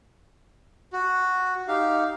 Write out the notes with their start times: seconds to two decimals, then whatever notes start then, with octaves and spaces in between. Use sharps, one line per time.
0.93 F#4
1.68 D#4 G4 F5